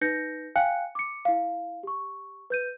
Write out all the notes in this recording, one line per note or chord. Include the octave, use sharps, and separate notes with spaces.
D#4 B4 G6 A#6 C#7
F5 G5 G#5 F#6 C#7
D6 C#7
E4 F5
G4 C#6
B4 G6 D#7